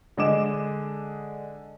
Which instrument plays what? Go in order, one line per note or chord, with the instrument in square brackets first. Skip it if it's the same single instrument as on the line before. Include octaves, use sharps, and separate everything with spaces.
[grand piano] D3 G#3 D#5 D6 E7